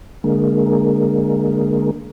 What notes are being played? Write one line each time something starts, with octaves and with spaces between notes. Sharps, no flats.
D3 G#3 A#3